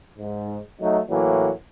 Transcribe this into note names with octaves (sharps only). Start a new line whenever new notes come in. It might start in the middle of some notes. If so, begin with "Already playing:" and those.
G#2
F#3 A3 D#4
A2 E3 F#3 A#3